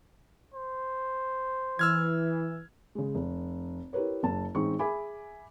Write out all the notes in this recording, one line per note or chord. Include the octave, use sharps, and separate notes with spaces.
C5
E3 E6 F6 G#6
C#3 G#3
F1
E4 G4 A#4 B4 C#5
F#1 A5
A1 G#3 C4 D#4 C#6
G#4 E5 G#5 B5 D6